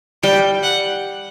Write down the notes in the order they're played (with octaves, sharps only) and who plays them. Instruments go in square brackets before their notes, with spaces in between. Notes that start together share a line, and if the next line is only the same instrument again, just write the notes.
[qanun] G3 [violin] G5
[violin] F#5